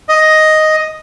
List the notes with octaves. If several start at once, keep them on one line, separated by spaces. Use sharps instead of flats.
D#5